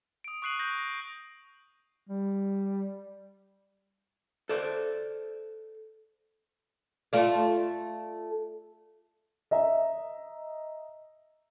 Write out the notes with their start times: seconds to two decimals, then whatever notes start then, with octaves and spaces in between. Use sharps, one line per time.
0.24 D#6 D7
0.42 C#6 D#6 F#6 C7 D#7 F#7
0.59 C#6 G6 A#6 F#7
0.78 A#6
2.09 G3
4.49 A4 C5 D5
7.13 A3 F4 D5
9.51 D#5 E5 A#5